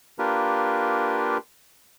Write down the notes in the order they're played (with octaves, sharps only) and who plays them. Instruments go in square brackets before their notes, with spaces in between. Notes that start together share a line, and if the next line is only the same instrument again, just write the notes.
[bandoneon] A#3 D4 F4 G4 A#4 B4